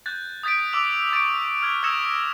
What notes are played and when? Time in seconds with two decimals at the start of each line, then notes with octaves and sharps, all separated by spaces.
0.06 F#6 G6 A6
0.43 D#6 G6 A6 B6 D7
0.73 D6 E6 F7
1.12 C#6 A6 D7
1.62 F6 G#6 F7
1.83 D#6 E6 G#6 A#6 C#7 E7